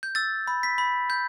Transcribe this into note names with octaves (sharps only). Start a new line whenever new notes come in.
G6
E6 A6
B5
B6
B5
G6